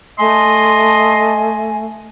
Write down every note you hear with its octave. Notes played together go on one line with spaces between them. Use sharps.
A3 D#5 G#5 C6